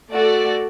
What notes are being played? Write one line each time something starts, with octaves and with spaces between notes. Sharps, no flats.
A3 F#4 A4 D5